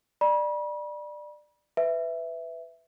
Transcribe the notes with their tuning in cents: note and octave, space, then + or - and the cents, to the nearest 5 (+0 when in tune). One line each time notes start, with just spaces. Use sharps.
D5 +20 B5 -40
B4 +15 E5 +0